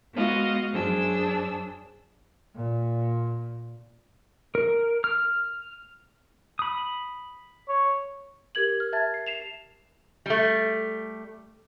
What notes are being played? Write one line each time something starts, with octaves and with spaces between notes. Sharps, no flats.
G#3 B3 F#4 D#5 F5
F#2 D4 G#4 C5 E6
A#2
A#4
F6
B5 D#6
C#5
G4 A#4 G#6 F#7
F6
E5 A5 G#6 A6
C7
C7 E7 F7
G3 A3